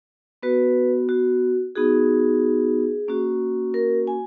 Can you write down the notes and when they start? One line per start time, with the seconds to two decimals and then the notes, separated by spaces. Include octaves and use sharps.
0.43 B3 F#4 B4
1.09 F#4
1.75 B3 D#4 F#4 G#4
3.08 A#3 C#4 F#4
3.74 A#4
4.07 G#5